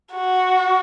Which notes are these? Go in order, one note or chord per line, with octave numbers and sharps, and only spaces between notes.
F#4